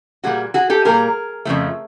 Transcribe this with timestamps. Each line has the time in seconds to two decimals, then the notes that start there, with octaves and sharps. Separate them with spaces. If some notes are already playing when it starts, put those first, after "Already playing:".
0.24 A#2 G3 A#3 F#4 G#4
0.54 F#4 G#4
0.70 G4 A4
0.85 A#2 G3 A#3 G#4 A#4
1.45 F2 C#3 F3 A3